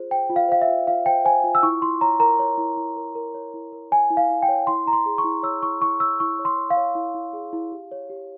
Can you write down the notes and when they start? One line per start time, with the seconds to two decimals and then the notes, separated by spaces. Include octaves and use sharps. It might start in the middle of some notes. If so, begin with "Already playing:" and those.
Already playing: F4 G#4 C5
0.11 C5 G5
0.29 F4
0.36 F5
0.49 C5 F5
0.62 E5
0.68 F4
0.87 F4 F5
1.06 C5 G5
1.25 C5 G#5
1.44 F4
1.55 E6
1.63 E4 C#6
1.82 E4 C6
2.01 C#5 A#5
2.20 A#4 A#5
2.39 C#5
2.58 E4
2.77 E4
2.96 A#4
3.15 A#4
3.35 C#5
3.54 E4
3.72 A#4
3.92 C#5 G#5
4.10 E4
4.17 F5
4.30 E4
4.43 G5
4.49 C#5
4.67 E4 C6
4.86 E4 A#5
4.93 C6
5.06 G#4
5.18 C#6
5.24 E4
5.43 C#5 E6
5.62 E4 C#6
5.81 E4 C#6
6.00 C#5 E6
6.20 E4 C#6
6.39 C#5
6.45 C6
6.57 C#5
6.70 F5
6.77 C#5
6.95 E4
7.15 E4
7.33 G#4
7.53 E4
7.72 G4
7.91 C#5
8.10 G4